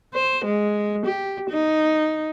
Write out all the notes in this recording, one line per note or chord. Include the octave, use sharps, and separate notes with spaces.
C5
G#3
G4
D#4